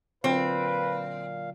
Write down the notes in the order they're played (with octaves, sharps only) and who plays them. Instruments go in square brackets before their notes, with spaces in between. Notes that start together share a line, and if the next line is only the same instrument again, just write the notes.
[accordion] A#2 F5 [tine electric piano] D3 F#3 F4 [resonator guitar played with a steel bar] C4 [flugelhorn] B4